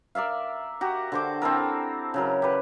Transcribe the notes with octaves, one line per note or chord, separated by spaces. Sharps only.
A#4 D5 E5 F5
F#4 G4 A#5
D3 C5 D6
C4 E4 A4 A#4
C#3 F#3 A#4
G4 B4